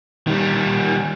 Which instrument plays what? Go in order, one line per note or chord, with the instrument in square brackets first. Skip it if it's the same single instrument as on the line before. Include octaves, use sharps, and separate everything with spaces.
[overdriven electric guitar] D#3 G3